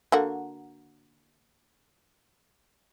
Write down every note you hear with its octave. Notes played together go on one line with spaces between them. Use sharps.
D3 A#3 F#4